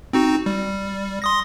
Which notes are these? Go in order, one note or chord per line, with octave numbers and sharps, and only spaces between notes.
C4 D#4 F#4
G3
C6 D#6 A#6